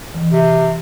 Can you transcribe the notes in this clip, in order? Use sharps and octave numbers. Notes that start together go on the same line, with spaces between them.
E3
C3